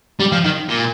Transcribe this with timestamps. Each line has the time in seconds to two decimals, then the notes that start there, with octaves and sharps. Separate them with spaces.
0.20 G3
0.32 F3
0.44 D#3
0.69 A#2